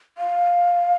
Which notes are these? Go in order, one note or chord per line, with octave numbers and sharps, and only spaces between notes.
F5